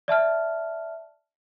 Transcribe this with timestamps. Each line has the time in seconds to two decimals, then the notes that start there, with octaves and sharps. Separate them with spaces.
0.08 D5 E5 A5 F6